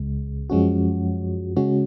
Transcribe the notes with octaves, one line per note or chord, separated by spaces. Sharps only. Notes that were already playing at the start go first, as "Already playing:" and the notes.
Already playing: C#2 C#3 G#3
F#2 F3 G#3 C#4 F#4
C#3 G#3 C#4 F#4